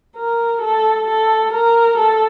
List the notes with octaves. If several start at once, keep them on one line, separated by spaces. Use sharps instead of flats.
A#4
A4
A4
A#4
A4